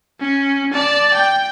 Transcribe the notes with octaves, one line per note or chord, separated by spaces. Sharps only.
C#4
D5 A5
G5